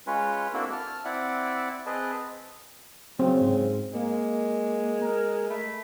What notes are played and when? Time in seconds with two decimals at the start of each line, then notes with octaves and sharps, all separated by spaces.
0.07 G#3 C#4 F4 B4 C#5
0.53 A#3 C4 D4 E4 F#4 A4
0.73 A5 F6
1.05 C4 E4 D5 E5 F#5
1.86 C4 G#4 B4 D#5 A5
3.19 C#3 F#3 C4
3.41 G#2
3.93 G#3 A#3
5.02 A#4
5.50 A3 B5